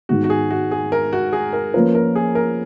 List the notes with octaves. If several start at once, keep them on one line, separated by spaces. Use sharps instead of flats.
G#2 D#3 G#3 B3 F#4
F#4
G#4
F#4
G#4
A#4
F#4
G#4
A#4
F3 A#3 C#4 F4 A#4 B4
A#4
G#4
A#4